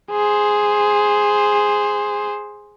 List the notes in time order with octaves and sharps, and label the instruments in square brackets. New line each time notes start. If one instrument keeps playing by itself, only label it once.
[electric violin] G#4 C5